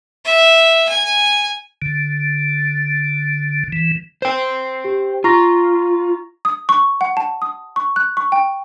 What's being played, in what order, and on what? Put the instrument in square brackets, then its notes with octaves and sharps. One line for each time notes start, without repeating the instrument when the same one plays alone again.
[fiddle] E5
G#5
[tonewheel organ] D3
E3
[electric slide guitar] C5 G5
[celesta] G4
[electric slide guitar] F4 [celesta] A#5 C#6 A#6
[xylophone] D#6
C#6
F#5
A5
D#6
C#6
F#6
C#6
G5